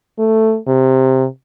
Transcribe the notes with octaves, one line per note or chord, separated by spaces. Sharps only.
A3
C3